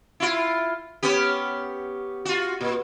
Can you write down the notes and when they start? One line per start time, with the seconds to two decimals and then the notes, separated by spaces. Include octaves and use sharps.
0.20 E4 F4
1.03 B3 C#4 G4
2.25 F4 F#4
2.61 A#2